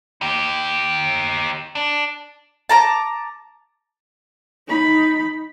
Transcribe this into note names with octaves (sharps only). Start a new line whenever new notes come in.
D#4 G4
D4
A5 A#5 D6
D#4 B5